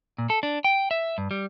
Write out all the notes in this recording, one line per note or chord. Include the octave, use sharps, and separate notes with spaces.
A#2
A4
D4
G5
E5
G2
G3